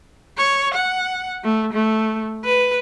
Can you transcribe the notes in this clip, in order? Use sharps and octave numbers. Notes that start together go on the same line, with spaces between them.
C#5
F#5
A3
A3
B4